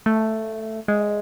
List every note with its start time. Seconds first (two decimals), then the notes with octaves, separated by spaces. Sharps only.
0.06 A3
0.88 G#3